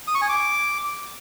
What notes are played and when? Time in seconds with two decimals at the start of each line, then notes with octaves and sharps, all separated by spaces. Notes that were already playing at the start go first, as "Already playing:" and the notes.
0.08 D#6
0.15 C#6
0.22 G#5
0.29 D6